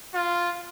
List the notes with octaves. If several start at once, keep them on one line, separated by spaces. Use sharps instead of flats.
F4